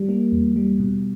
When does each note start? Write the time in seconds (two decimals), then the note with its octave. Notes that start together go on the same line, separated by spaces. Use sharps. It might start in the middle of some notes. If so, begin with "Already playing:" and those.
Already playing: G3
0.09 A#3
0.32 E2
0.56 G3
0.80 B2